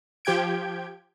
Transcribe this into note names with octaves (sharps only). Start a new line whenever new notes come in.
F3 G4 G5 G6 G#6 D7